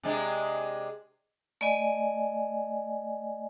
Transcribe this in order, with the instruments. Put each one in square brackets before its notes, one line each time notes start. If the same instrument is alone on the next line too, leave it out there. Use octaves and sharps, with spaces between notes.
[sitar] C3 G#3 D4
[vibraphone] A3 D5 D#5 G#5